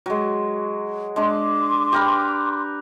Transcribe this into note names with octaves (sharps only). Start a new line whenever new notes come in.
F#3 G#3
G#3 D4 C6 D6
G4 A#4 B4